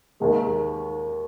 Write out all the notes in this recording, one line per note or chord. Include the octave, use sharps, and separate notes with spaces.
D#2 D#3 G#3